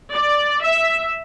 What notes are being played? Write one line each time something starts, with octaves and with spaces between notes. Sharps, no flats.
D5
E5